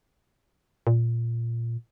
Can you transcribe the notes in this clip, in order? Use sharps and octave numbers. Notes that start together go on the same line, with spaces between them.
A#2